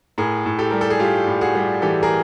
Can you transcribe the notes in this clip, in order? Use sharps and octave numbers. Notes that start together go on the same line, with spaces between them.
A2 G#4 A#4
A2
G4 A4
G3 A#4
A4
G#4
G3 F4 G4
A2
F#4 G#4
G3
E3 G4 A4
G#4 A#4